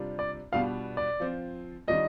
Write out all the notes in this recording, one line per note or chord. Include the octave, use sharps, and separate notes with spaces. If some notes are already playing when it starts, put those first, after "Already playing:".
Already playing: C3 G3 D4 F4
D5
B2 G3 B3 D4 F4 F5
D5
F3 C4 F4
D#3 G3 D4 F4 D#5